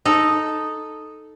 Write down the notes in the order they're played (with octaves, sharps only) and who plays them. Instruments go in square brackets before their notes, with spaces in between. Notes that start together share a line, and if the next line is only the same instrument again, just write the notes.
[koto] D#4 A4